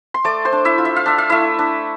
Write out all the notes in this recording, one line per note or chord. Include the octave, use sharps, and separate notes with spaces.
C6
A3 D5 D6
C5 C6
D4
E4 E5
F4
E5
F5
D4 E5
F5
A3 E4 E5
D4